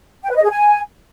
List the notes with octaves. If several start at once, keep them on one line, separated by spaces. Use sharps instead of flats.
G5
B4
D#5
G#4
G#5